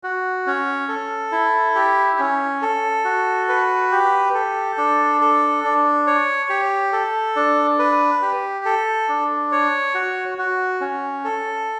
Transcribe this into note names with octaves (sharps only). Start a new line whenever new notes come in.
F#4
C#4
A4
E4
G4
C#4
A4
F#4
B4
G4
A4
D4
A4
D4
C#5
G4
A4
D4
B4
G4
A4
D4
C#5
F#4
F#4
C#4
A4